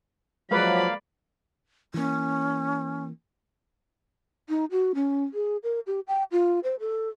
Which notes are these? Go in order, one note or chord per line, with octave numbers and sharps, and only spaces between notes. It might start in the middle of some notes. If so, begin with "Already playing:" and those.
F3 F#3 G#3 A#3 B4 D5 F5 B5
E3 A#3 C#4
D#4
F#4
C#4
G#4
A#4
G4
G5
F4
C5
A4